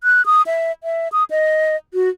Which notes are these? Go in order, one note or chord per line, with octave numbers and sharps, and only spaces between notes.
F#6
D#6
E5
E5
D#6
D#5
F#4